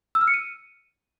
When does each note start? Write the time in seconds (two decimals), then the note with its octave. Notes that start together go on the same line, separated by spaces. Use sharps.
0.15 E6
0.21 F6
0.27 C#7
0.34 D#7